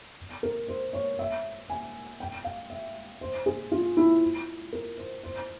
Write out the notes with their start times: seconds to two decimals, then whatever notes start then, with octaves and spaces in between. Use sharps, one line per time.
0.43 A#4
0.68 C5
0.93 C#5
1.19 E5
1.70 G#5
2.20 G5
2.44 F5
2.70 E5
3.21 C5
3.46 G#4
3.72 F4
3.97 E4
4.73 A#4
4.98 C5
5.23 C5